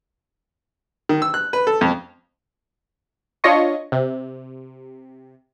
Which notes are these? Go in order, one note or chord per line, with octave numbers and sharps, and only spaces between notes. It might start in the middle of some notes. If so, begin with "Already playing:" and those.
D#3
E6
F#6
B4
A4
F2
D4 F4 C#5 D#5 C#6
C3